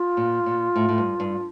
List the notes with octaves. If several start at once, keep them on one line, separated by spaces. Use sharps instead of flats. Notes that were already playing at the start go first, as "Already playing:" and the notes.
Already playing: F4
A#2
A#2
A2
A2
G2
G2